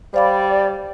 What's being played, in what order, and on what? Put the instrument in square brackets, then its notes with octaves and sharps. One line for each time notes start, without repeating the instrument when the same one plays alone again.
[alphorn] G3 [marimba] C5 F5 B5 [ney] D5